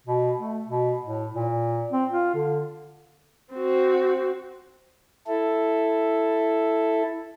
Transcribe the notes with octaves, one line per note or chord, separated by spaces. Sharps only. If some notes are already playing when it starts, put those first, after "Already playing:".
B2
A3
B2
A2
A#2
C4
F4
D3
C4 F#4
E4 A4